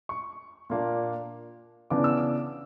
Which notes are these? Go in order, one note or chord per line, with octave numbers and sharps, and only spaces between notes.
C#6
A#2 A#3 D4
C#3 E3 B3 D4 D6
E6
D6